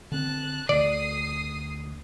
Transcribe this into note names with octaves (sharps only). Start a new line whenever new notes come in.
D3 C4 A5 F#6
D2 D3 D5 D#6 C7